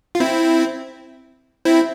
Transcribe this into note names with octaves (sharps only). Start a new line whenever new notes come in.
F4
C4 E4
C4 E4